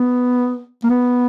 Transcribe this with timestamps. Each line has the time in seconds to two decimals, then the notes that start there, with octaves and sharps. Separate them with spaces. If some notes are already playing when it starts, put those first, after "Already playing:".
Already playing: B3
0.83 A#3
0.89 B3